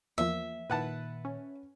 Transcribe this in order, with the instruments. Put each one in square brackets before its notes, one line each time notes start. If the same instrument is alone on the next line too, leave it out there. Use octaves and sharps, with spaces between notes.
[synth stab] E2 F3 [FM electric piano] A#3 [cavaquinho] E5
[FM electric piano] A#2 D#3 [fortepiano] B4 F#5 A5
[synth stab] C#4